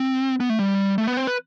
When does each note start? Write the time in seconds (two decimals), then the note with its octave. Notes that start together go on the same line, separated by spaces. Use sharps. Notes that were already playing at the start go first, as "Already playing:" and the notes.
Already playing: C4
0.40 B3
0.50 A3
0.59 G3
0.98 A3
1.07 B3
1.17 C4
1.27 B4